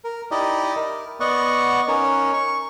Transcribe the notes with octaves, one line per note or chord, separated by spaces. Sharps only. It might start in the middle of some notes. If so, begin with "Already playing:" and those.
A#4
D#4 E4 G4 D5 D#5
A#4
B3 D5 D#5 F#5 C#6
C#4 D#4 A#4 C#5
C#6